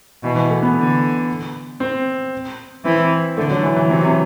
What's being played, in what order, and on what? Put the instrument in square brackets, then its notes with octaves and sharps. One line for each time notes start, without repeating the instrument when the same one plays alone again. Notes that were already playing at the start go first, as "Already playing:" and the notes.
[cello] B2 [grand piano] E3
[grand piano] E3
A3
B3
[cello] D3
[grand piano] C4
[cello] E3 [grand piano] C4
[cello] D3 [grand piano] A3
[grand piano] F#3
E3
E3
[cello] C3 [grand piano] F#3